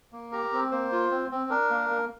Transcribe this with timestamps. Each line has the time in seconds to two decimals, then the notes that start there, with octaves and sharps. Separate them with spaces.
0.13 A#3
0.32 G4 A#4 A#5
0.53 C4
0.71 A#3 C5
0.92 F4
1.11 C4
1.31 C4
1.50 D4 A#4
1.70 A#3
1.90 A#3